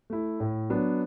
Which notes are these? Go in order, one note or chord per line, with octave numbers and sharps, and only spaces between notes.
A3 E4
A2
F#3 B3 D4